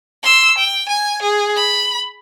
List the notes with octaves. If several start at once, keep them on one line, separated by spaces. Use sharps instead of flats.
C6 E6
G5
G#5
G#4
B5